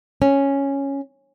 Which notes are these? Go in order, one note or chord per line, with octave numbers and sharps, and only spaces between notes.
C#4